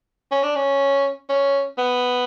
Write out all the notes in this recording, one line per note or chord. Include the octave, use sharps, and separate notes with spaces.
C#4
D4
C#4
C#4
B3